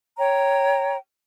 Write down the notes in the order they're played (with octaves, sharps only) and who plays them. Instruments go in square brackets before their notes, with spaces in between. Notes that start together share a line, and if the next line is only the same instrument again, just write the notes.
[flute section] C#5 G5 A#5